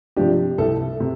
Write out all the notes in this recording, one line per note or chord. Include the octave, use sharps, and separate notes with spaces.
C3 F3 D4 G4
C2 A4
C3